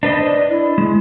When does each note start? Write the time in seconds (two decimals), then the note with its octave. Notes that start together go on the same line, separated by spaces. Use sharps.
0.03 D4 B4 C5 D#5
0.24 D5
0.49 E4
0.78 G#3